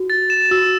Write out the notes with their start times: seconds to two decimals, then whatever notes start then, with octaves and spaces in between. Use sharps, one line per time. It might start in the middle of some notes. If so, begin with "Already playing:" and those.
Already playing: F#4
0.10 A6
0.30 E7
0.51 F#4 E6